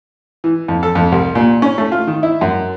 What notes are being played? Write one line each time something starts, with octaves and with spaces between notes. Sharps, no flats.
E3
F2
A4
F2
C2
A#2
C#4
A3
F4
D#3
E4
F#2